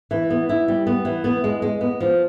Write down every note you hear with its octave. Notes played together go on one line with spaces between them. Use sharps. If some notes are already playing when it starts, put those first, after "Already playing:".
E3
B3
E4
G3
B3
E3
B3
G#3
G#3
B3
F3